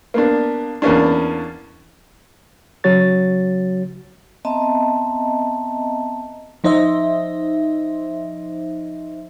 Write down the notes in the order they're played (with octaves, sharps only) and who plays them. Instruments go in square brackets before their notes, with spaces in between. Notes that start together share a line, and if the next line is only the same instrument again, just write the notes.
[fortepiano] A#3 B3 D4
E2 A#3 C#4 D4
[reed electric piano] C#3 F#3 F#4 C#5 A6
[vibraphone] B3 C4 D#5 E5 A5 A#5
[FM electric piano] F3 D#4 C5 D#5 E5